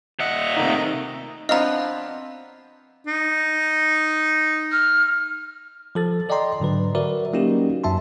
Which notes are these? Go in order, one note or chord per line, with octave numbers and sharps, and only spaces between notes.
A#2 D#5 E5 F#5
C3 D#3 A3 D#4
F3 B3 C4 D4 D#5 F5 A#5
D#4
F6
F3 A4 A6
A4 D5 D#5 G5 A#5 C6
G#2 D3 F#3 B4
F#4 A#4 B4 D5 E5
F#3 A#3 C#4 D#4 F#4 G4
F#2 F#3 E5 A5 C6